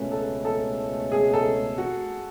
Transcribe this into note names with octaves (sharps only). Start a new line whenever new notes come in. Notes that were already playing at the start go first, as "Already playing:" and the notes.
Already playing: C#2 B2 A3 C#4 B4
A4
A4
G#4
A4
F#4